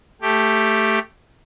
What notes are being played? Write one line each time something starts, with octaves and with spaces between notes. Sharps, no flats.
A3 G4